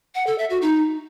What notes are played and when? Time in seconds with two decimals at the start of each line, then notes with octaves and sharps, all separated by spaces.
0.15 F#5
0.27 A4
0.38 E5
0.50 F#4
0.62 D#4